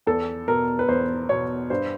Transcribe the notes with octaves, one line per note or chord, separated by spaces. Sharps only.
E2 A4
B2 A#4
B4
E2 C5
B2 C#5
G2 C5